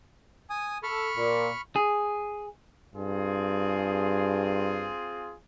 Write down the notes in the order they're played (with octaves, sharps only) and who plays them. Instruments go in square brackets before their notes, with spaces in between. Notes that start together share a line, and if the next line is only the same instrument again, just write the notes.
[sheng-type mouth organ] G#5 D#6
[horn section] A4 [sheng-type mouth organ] B5 C#6 F6
[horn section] A#2
[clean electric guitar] G#4
[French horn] G2 [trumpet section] C4 F4 G#4